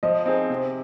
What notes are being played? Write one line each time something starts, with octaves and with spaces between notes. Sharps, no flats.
F3 D#5
C4 D#4 G#4
C3